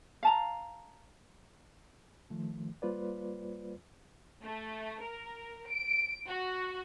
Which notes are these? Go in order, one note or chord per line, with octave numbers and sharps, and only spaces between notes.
F5 A5 A#5
D#3 F3 A3
G3 A#3 F4 B4 C5 D5
A3
A#4
D7
F#4